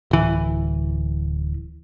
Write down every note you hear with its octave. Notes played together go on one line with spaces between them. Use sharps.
D1 E3